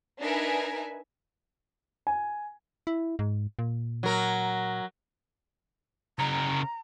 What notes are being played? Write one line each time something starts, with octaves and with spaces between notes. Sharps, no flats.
D4 D#4 A#4 B4 E5 G#5
G#5
E4
G#2
A#2
F#3 A#4
C#3 A#4 A#5